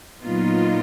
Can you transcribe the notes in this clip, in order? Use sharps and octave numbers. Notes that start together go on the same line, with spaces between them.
A#2 F#3 B3 D#4 F4